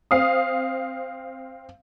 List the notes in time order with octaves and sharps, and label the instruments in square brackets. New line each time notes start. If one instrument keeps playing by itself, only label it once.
[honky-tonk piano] C4 F5 D#6